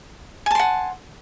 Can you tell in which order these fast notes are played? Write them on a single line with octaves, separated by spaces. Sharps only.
G#5 A5 C6 F#5